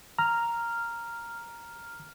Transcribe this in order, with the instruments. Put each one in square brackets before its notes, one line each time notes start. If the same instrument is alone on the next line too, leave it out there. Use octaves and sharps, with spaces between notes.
[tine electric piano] A#5 [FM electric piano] F6